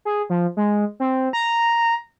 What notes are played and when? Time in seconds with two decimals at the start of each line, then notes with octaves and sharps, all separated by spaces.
0.05 G#4
0.30 F3
0.57 G#3
1.00 C4
1.33 A#5